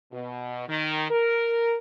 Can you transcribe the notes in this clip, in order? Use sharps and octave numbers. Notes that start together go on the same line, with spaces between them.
B2
D#3
A#4